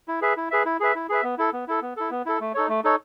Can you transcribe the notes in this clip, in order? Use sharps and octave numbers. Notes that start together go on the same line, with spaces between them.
E4
G#4 B4 E5
E4
G#4 B4 E5
E4
G#4 B4 E5
E4
G#4 B4 E5
B3
E4 A4
B3
E4 A4
B3
E4 A4
B3
E4 A4
A3
D#4 A4 C#5
A3
D#4 A4 C#5